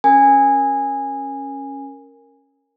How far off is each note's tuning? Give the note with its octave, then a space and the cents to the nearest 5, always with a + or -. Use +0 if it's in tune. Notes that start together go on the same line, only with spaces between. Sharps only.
C#4 -10 A#4 +0 G#5 -15